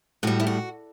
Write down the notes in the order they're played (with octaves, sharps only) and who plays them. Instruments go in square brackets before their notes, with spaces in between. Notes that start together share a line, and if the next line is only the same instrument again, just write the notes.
[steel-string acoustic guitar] A2 G3 F#4
E4
F#4